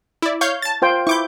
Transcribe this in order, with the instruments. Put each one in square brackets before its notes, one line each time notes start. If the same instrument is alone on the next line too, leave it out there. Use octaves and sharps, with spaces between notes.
[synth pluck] E4 D5
C#5 F5 G6
A5 A6
[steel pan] F4 C5 G5
[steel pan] E4 [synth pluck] C#6 D6 G6